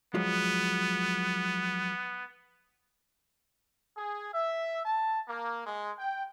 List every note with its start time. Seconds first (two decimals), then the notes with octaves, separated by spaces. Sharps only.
0.15 F3 F#3 G#3 B3
3.96 G#4
4.33 E5
4.86 A5
5.28 A#3
5.67 G#3
5.99 G5